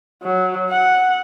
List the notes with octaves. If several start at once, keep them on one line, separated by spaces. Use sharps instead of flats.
F#3
F#5